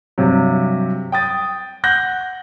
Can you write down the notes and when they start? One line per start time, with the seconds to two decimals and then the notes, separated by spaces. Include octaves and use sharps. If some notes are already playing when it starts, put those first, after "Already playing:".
0.18 G2 C3 F#3
1.12 G5 D#6 A6
1.84 F#5 F#6 G6 A#6